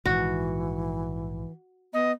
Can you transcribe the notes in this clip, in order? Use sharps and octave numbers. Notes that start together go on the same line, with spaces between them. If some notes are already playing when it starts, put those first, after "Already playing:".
A#1 G#2 D#3 E3 F#4
B3 D#5